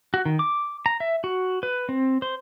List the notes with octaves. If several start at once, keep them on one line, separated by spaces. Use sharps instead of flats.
F#4
D#3
D6
A#5
E5
F#4
B4
C4
C5